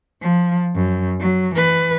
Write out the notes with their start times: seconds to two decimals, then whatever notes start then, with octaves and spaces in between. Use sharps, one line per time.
0.22 F3
0.75 F#2
1.20 F#3
1.54 E3 B4